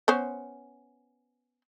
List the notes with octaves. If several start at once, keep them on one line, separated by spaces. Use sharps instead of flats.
B3 C#4 C5